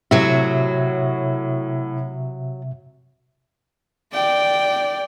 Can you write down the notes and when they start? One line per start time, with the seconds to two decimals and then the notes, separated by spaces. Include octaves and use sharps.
0.11 A2 C3 F#3 F#4 E5
4.13 D5 G5